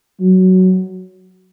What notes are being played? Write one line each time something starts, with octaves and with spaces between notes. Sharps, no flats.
F#3